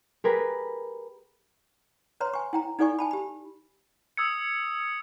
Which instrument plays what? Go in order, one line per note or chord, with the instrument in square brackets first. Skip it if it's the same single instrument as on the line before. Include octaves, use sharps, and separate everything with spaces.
[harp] G4 G#4 A#4 B4
[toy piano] B4 C#5 A#5 C6
G#5 C#6
E4 G5 A#5
D#4 E4 A4 D5 G#5 C#6
G#5 A5 B5
G4 B5
[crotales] D#6 E6 G#6 C#7